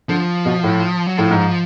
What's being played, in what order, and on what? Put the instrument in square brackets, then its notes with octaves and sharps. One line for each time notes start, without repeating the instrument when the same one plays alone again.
[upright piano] D3 [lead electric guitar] F3
[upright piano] B2
A2
[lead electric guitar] F#3
[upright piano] A2 [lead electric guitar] F3
[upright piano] G#2